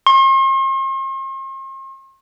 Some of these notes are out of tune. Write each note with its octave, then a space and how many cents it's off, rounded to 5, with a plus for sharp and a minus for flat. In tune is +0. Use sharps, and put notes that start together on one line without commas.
C6 +45